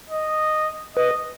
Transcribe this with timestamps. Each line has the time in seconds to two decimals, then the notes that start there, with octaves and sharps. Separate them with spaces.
0.10 D#5
0.96 B4 D#5